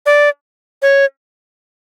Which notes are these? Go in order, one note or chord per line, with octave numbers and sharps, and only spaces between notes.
D5
C#5